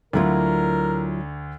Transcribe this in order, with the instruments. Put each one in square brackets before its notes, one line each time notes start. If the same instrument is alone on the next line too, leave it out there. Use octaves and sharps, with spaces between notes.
[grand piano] D2 D3 [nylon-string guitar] F#3 E4 F4 [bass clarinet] A#4